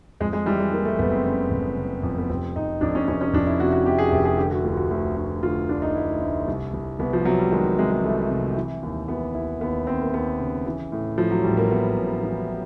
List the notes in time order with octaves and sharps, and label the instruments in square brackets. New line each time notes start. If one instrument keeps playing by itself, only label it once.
[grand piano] F2 G#3
G#3
E3 G3
G#3
E3 A#3
A3
F#1 B3
C4
C#3
F#1
C#3
F2
B3
F1 C4
F1 D#4
F2 D4
C#4
F1 C#4
C#4
F2 D4
E4
C3 F#4
F#4
C3 G4
G#4
F1 G4
G#4
D3 G4
F#4
D2 F4
F#4
D2
D2
D3 F4
D2 D4
D#4
D2 E4
D2
C2
C2
C2 B3
F3
C3 F#3
G3
D#3 G#3
C3 G#3
G#3
C2 A3
C3
E3
D#2
E3 B3
D#2 E4
D#2 B3
D#2 C4
A#3
D#2 B3
C#3
E3
A2
A2 F3
F#3
A1 G3
A#3
A2 B3
A1
E3